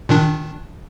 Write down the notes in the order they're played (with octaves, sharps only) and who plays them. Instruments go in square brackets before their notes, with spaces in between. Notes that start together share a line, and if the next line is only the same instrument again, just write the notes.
[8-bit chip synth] A#2 D#3 D4